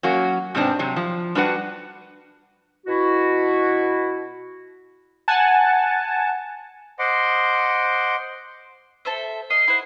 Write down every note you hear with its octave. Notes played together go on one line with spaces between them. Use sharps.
F#3 A#3 C#4 F#4
G#2 C3 B3 C4 D4
C3 F#3
F3
G3 D4 F#4 B4 F#5
B2 E4 F#4
F#5 G#5 A5
C5 D#5 F#5 C6 D6
A4 C5 E5
D#5 F5 C7
E4 C5 F#5